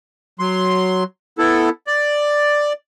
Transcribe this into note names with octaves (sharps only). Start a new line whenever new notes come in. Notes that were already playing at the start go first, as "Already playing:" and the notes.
F#3 C6
B3 E4 A4
D5